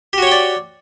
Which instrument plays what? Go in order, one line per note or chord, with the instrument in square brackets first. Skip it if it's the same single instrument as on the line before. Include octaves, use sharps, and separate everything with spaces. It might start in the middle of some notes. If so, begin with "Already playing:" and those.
[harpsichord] G4
F#4
C#5
G5
D5